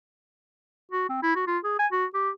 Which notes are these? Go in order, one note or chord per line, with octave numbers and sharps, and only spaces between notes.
F#4
C4
E4
F#4
F4
G#4
G#5
F#4
G4